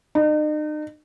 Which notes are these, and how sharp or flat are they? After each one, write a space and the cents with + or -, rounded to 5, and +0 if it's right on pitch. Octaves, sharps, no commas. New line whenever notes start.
D#4 -40